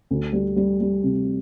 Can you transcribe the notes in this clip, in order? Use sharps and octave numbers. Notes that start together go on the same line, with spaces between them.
D2
G3
G3
G3
C3